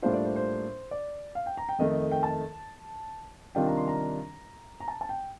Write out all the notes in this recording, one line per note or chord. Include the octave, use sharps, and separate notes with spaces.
A2 G3 A#3 D4 F4 C5
D5
C5
C5
D5
F5
G5
A#5
G5
F2 D#3 A3 D#5
G5
A5
C3 D#3 G3 D4 F4 G5
A#5
C6
A#5
A#5
A5
A5
G5